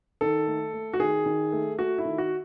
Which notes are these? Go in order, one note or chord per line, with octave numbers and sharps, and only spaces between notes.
D#3 A4
A3
A3
F#4
D#3 G#4
D#3
A3
A3 F#4
E4
D#3
F#4